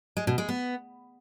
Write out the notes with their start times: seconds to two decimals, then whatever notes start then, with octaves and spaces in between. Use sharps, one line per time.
0.17 G#3
0.27 B2
0.38 G#3
0.49 B3